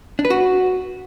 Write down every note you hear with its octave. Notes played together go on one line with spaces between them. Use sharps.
D4
B4
F#4